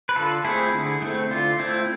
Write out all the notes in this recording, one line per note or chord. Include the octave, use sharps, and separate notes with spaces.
B4
D3 F4 A4
A3 C4 E4 G#4
D3
A3 C4
D3 F4
A3 C4 E4